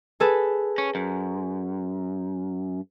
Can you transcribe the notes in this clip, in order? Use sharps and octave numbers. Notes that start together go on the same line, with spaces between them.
G#4 A4 B4
C#4
F#2